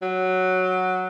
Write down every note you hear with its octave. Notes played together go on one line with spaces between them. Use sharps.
F#3